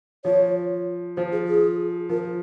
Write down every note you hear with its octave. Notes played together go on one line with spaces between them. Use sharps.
F3 C#5
F3 C5
G#4
G#4
F3 A#4